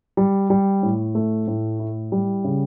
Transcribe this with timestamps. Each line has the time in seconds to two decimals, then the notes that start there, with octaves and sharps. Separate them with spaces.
0.17 G3
0.50 G3
0.83 A2
1.15 A3
1.48 A2
1.79 E4
2.12 G3
2.44 C#3